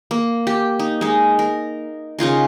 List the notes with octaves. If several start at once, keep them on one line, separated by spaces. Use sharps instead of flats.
A#3
G4
D#4
G#3 D#4
A#4
C#3 D#4 F4 A#4